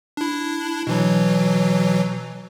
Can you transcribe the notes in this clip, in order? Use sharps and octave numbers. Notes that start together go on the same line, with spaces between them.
D4 E4
B2 E3 F#3